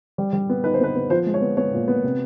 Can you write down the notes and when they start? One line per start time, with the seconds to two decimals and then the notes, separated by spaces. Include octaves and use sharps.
0.18 G3
0.33 G3
0.49 B3
0.64 D#4 B4
0.74 C5
0.80 B3 B4
0.96 B3
1.10 F3 C5
1.26 G#3
1.34 C#5
1.41 B3
1.57 B3 C#5
1.73 A#2
1.88 B3
2.04 C3